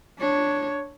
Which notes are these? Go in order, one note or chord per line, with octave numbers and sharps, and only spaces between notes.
D4 C#5